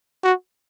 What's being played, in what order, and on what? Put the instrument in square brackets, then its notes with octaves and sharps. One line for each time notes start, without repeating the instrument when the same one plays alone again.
[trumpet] F#4